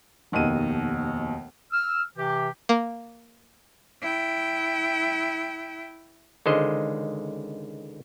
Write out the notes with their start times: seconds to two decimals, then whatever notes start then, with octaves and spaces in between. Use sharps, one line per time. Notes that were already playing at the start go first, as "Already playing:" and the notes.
0.32 F1 D#2 B2 D#7
1.72 E6 F6
2.17 C3 E3 G4
2.69 A#3
4.01 E4 G5
6.46 C#2 D3 D#3 G#3 C5 D#5